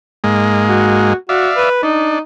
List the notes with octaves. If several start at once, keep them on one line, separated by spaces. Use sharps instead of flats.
G#2 G#3 A#3
F#4
F#4 D5 E5 F5
B4
D4 D#4